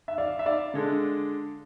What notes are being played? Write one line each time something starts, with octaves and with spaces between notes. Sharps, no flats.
E5
D5 F5
E5
D5 F5
D3 G#3 D4 A4